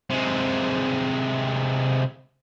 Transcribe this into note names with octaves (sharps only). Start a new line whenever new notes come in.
C3 G#3